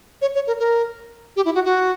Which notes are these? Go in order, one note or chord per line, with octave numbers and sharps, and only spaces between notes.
C#5
C#5
A#4
A#4
G4
E4
F#4
F#4